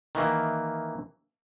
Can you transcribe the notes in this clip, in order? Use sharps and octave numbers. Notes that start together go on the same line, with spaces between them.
D#3 E3 A#3